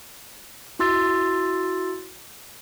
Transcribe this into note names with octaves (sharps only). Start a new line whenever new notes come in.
E4 F#4 C6 E6 A6